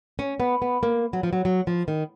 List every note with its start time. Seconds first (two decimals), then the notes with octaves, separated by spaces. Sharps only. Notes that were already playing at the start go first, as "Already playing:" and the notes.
0.19 C#4
0.40 B3
0.62 B3
0.83 A#3
1.13 F#3
1.23 F3
1.33 F#3
1.45 F#3
1.67 F3
1.88 D#3